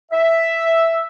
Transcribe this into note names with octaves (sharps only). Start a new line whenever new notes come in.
E5